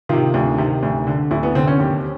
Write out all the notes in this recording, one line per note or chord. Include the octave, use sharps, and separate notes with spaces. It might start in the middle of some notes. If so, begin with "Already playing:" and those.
C3 D#3 F4
D2
C3 D#3
D2
D3
D2 E4
B3
D3 C4
C#4
D#2 G4